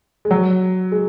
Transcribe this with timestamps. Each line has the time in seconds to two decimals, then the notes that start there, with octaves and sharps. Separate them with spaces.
0.25 G#3
0.31 F#3
0.92 G#3